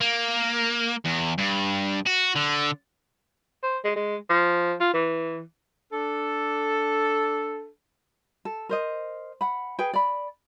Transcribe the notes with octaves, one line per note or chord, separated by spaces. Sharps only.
A#3
E2
G2
F#4
D3
C5
G#3
G#3
F3
F4
E3
D4 A4
A4
A#4 C5 D#5
F#5 B5
G#4 B4 G5
D5 B5